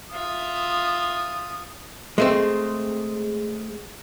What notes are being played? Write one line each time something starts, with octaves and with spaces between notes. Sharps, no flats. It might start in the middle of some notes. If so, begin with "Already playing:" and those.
F4 E5 D#6
G#3 A3 C4